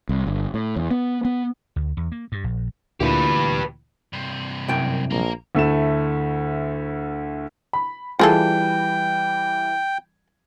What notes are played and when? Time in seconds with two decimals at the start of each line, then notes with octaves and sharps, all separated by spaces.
0.09 C2
0.27 G1
0.54 A2
0.76 E2
0.91 B3
1.25 B3
1.76 D2
1.97 E2
2.12 A#3
2.32 G2
2.44 A#1
3.00 D2 A#2 E3 G4 B4
4.13 G2 C3
4.68 C2 F#2 G5
5.11 A#1 A#3 A#4
5.55 D2 A3 E4 E7
7.73 B5
8.19 E3 G3 F4 G#4 A4 G5